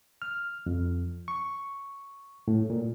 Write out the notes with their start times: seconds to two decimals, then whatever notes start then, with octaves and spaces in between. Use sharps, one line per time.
0.22 F6
0.66 F2
1.28 C#6
2.48 A2
2.70 A#2